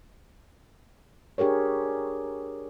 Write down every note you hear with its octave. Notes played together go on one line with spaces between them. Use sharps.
D4 G4 G#4 A#4 C#5